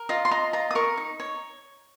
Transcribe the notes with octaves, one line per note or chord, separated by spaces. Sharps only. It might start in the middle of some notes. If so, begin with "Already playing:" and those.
Already playing: A#4
F4 D#5
C6
D#5 A#5
F4 A#5
D#6
A#4 C#6
D#4
C#5